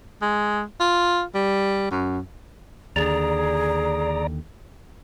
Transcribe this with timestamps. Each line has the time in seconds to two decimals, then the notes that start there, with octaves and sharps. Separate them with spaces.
0.22 G#3
0.80 F4
1.35 G3
1.91 F#2
2.96 D#2 D3 G#4 D5 A#5